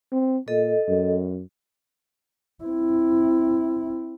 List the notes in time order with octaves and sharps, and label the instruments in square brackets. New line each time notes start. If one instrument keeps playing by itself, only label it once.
[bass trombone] C4
[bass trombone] A#2 [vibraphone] A4 D#5
[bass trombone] F#2
[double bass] C4 E4